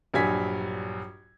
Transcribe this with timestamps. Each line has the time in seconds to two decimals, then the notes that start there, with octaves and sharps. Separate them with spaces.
0.14 A#1 G2 F#3 G#5 G#6 B6